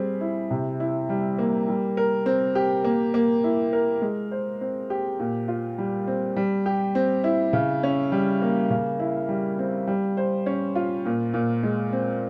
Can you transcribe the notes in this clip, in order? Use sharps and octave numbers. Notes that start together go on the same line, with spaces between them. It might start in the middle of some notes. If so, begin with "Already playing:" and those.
Already playing: G3 C4 G#4
E4
C3
E4
G3
A#3
G3
A#4
C4
G4
A#3
A#3
E4
A#4
G#3
C5
C4
G4
A#2
F4
G3
C4
G3
G4
C4
E4
C#3
C#4
G3
A#3
C#3
E4
G3
C4
G3
C5
C#4
F4
A#2
A#2
G#3
C4